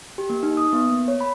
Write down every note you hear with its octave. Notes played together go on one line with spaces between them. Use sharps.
G4
A#3
D#4
D#6
B3
A#3
C#5
B5